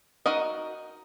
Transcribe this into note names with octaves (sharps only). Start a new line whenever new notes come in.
D#4 F#4 A#4 D#5